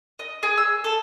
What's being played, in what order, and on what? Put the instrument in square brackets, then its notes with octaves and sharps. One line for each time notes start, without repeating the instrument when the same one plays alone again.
[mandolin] D#5
G#4
E6
A4